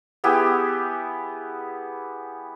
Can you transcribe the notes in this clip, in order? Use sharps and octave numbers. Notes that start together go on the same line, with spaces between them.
B3 E4 G4 G#4